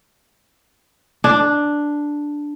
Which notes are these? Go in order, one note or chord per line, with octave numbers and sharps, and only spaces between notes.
D4